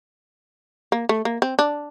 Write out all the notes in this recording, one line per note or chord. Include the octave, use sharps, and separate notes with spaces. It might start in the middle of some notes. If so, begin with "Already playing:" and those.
A#3
A3
A#3
C4
D4